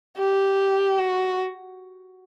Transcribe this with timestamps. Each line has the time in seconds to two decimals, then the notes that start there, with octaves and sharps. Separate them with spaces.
0.18 G4
0.98 F#4